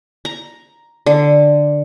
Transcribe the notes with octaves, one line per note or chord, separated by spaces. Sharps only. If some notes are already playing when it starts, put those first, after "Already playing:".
A#5
D3